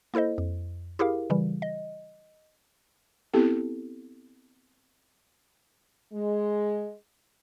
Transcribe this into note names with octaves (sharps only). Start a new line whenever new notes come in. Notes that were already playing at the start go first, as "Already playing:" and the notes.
A#3 E4 A4 C5 D#5
F2
E4 G4 G#4 A#4 F5
C#3 E3 G3
D#5
B3 C4 E4 G4 A4
G#3